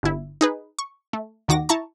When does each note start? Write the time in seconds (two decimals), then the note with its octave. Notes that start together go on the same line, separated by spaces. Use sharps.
0.03 G1 E4
0.41 D#4 G#4 B4
0.79 C#6
1.13 A3
1.48 D#2 D#3 F#4 D6 A#6
1.69 E4 A5 A#5 C#6